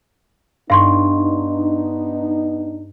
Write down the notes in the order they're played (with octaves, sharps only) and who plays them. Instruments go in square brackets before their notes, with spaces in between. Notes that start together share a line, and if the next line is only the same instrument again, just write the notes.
[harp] G2 [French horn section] B3 D4 D#4 [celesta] F5 C6 C#6